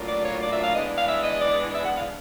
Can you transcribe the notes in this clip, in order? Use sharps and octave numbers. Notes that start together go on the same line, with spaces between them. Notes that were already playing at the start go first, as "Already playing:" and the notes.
Already playing: A2 F#3 A#3 D4 F4
D5
C#5
D5
E5
F5
E3 G#3 B3 D4 D#5
F5
E5
D#5
D5
E5
F#5
F5